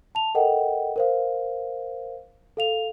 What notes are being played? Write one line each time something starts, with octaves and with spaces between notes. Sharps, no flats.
A5 F7
A4 A#4 D#5 F#5 G5
A#4 C5 F5
A4 F5 F7